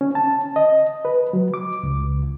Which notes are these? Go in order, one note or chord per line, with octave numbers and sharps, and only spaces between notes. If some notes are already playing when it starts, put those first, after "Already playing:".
C#4
A5
D#5
B4
F#3
D6
C#2